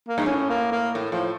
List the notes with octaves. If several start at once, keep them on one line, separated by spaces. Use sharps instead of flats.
A#3
G2
A2 C#4
A#3
A#3
A2
A2 F3